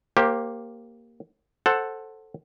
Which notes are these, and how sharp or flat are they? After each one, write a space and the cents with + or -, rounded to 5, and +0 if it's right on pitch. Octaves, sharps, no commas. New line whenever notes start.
A#3 +0 G4 +0 C5 +35
A4 +0 C5 +15 F#5 +0